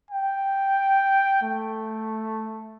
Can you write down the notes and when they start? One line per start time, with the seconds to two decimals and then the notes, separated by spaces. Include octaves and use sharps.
0.11 G5
1.43 A3